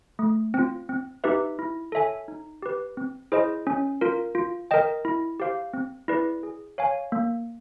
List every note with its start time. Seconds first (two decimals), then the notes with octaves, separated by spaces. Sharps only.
0.19 A3
0.54 C4 F4
0.89 C4
1.24 D#4 G4 B4 E5
1.59 E4
1.92 A4 C#5 E5 G#5
2.28 D#4
2.62 G4 B4
2.97 C4
3.32 E4 G#4 C5 D#5
3.67 C#4
4.01 F4 A#4
4.35 F4
4.71 A#4 D#5 G5
5.05 E4
5.40 G4 C5 F5
5.74 C4
6.08 E4 G#4 B4 D5
6.43 G#4
6.78 C#5 F5 G#5
7.12 A#3